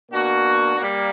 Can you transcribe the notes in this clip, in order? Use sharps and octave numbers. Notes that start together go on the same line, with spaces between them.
B2 A#3 D4 F#4
G3 A#3